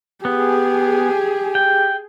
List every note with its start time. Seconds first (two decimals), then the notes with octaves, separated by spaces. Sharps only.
0.25 B3 G4 G#4
1.55 G5